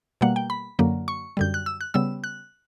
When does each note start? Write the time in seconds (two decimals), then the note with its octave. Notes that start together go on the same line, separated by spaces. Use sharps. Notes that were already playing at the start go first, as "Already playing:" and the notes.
0.21 B2 G3 A#3 F#5
0.36 G5
0.50 B5
0.79 F#2 D3 F#3 A#3
1.08 C#6
1.37 F#2 D3 G3 G6
1.54 F#6
1.66 E6
1.81 F#6
1.94 C#3 G3 B3 E6
2.24 F#6